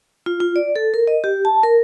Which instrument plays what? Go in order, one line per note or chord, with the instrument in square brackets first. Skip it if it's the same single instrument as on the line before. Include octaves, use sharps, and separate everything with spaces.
[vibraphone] F4
F4
D5
A4
A#4
D#5
G4
A5
A#4